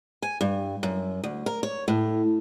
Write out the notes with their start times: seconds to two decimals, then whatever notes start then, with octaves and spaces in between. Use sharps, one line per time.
0.22 G#5
0.41 G2
0.83 F#2
1.24 D2
1.46 A#4
1.63 C#5
1.88 A2